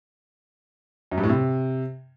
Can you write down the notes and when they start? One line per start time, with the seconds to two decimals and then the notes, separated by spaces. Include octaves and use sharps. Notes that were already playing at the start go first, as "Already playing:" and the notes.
1.12 F#2
1.17 G2
1.23 A2
1.29 C3